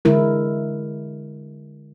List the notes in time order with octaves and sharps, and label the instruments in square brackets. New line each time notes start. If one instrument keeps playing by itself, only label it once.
[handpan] D3 G#3 E4 A#4